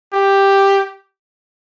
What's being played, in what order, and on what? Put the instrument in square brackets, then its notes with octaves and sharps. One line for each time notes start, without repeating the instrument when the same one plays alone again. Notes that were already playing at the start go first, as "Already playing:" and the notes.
[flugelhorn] G4